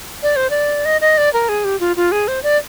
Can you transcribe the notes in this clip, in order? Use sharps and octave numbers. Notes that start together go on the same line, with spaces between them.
D5
C5
D5
D#5
D#5
D5
A#4
G#4
G4
F4
F4
G#4
C5
D5